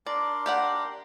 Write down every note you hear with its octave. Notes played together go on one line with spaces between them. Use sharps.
D4 A#4 D5 C6
G4 D5 F#5